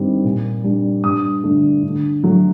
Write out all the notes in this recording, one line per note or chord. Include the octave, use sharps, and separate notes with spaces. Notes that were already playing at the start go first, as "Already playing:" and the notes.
Already playing: G2 D#3 G3 C4
A#2
G3 D4
G2 D#6
D3 A3 D4
D3
F#3 A3